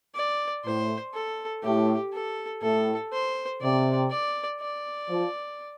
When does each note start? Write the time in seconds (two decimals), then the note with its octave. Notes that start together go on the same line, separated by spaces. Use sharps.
0.15 D5
0.65 A2 C5
1.13 A4
1.63 A2 G4
2.13 A4
2.62 A2 A4
3.13 C5
3.62 C3 D5
4.11 D5
4.61 D5
5.10 F3